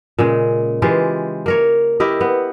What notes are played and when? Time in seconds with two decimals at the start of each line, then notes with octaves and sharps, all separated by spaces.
0.18 A#2 C#3 G#3
0.82 E3 G#3 F4 G4
1.46 A#3 A#4 C#5
2.00 E4 G4 A#4 D#5
2.21 B3